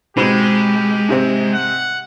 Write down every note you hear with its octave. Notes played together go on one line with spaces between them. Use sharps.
G#2 B2 G#3 C4 G4
G#2 C3 C4
F#5